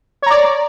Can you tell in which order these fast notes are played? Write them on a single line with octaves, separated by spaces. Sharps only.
C#5 A#5 D5